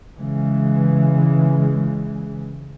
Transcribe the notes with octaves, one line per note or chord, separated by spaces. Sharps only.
C#3 E3 G#3